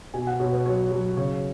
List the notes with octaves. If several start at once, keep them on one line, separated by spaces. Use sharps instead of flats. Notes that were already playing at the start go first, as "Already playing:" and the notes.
B2 G#5
F#5
B2 C#5
B4
F#3 C#5
F#3
C#3 C#5